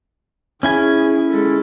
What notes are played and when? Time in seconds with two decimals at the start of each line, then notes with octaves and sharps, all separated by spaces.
0.63 C#4 E4 G#4 G#5
1.30 G#3 A4